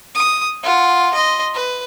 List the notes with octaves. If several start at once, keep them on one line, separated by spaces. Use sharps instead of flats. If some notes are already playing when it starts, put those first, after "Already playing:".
D#6
F4 F#5
D#5 C6
B4